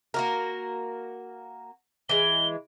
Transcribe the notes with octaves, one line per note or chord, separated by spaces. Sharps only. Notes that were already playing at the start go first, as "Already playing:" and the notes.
A#3 F#4 A#4
E3 G#3 G7